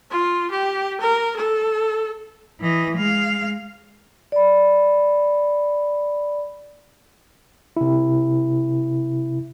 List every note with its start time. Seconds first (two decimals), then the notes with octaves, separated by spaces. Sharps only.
0.10 F4
0.50 G4
1.00 A#4
1.37 A4
2.61 E3 D#5
2.97 G#3 F5
4.32 D5 B5
7.77 C3 E4